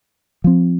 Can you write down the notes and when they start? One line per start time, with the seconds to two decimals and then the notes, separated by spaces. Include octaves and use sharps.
0.44 F3 C4